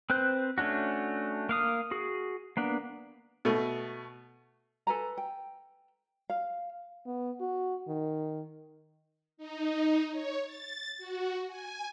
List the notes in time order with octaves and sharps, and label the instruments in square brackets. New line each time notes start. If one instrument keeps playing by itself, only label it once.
[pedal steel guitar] C4 B4 C5 F#6
A3 C#4 D4 F#4
A#3 F5 D#6
F#4 G#4
A#3 B3 D4
[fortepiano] B2 A3
[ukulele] A4 B4 G#5 A#5
G5
F5
[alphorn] B3
F#4
D#3
[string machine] D#4
C#5
A6
F#4
G#5